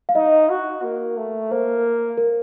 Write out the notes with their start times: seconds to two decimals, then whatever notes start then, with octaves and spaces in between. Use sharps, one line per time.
0.09 F5
0.15 D#4 D#5
0.49 F#4
0.83 A#3
1.17 A3
1.51 A#3 C5
2.18 A#4